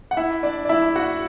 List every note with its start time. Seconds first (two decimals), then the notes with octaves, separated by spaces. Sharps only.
0.11 F#5
0.17 E4 E5
0.43 D4 D5
0.65 D5
0.69 E4 E5
0.96 F#4 F#5